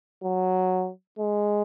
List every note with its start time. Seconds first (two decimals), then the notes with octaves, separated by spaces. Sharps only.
0.24 F#3
1.19 G#3